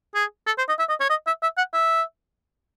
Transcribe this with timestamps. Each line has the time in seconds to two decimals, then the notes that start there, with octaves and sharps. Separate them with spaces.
0.15 G#4
0.47 A4
0.58 C5
0.69 D#5
0.79 E5
0.90 D#5
1.01 C#5
1.10 D#5
1.27 E5
1.43 E5
1.58 F#5
1.74 E5